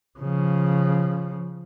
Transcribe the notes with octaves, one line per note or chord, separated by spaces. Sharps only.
C#3 F3